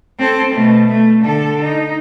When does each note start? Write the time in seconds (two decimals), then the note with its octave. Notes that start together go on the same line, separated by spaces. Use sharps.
0.19 C4 A4
0.53 B2 A3
0.87 A3
1.21 D3 A4
1.61 D#4